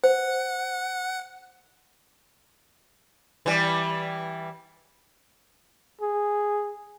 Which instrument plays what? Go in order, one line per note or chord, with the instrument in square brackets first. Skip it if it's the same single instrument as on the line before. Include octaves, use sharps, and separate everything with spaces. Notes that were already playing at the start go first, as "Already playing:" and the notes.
[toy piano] C5 [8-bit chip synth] F#5
[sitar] E3 G3
[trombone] G#4